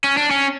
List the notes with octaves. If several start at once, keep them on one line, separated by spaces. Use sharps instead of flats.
C#4
D4
C#4